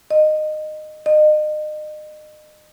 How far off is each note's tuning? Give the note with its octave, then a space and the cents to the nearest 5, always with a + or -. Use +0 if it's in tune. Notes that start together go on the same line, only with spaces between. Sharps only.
D#5 -20
D#5 -35